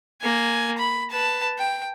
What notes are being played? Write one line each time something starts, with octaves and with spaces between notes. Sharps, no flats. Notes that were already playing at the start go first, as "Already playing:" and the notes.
A#3 G#5
B5
B4 A5
G5